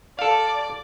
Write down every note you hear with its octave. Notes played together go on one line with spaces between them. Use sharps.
A4 D5 F5